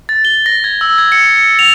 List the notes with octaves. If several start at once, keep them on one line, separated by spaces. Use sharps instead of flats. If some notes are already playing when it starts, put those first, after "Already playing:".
A6
G7
A#6
G#6
E6
G#6
C#7
C#7
F7